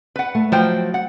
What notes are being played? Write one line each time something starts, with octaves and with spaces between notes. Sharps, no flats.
B4 F#5
A3
F3 F#3 C5 G5
F#5